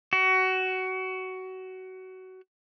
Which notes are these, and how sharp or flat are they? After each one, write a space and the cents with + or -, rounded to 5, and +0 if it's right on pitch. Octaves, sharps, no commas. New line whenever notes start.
F#4 +20